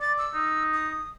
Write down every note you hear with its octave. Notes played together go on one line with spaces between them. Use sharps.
D5 A6
E6
D#4
D#6